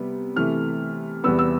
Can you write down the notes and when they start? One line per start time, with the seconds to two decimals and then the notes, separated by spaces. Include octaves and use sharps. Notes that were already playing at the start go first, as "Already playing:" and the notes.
Already playing: C3 G3 B3
0.36 C3 E3 A3 F6
1.24 E2 C3 G3 B3 E6
1.39 E6